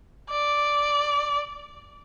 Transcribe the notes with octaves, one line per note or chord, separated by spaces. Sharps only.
D5